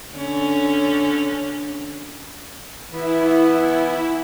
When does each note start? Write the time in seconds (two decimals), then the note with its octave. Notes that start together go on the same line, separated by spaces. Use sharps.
0.15 D3 C#4
2.92 E3 B3 E4